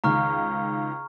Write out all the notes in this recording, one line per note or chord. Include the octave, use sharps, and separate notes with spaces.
C#2 D#3 A#5 C#6 F6